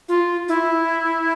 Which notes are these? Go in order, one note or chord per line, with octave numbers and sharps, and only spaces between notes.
F4
E4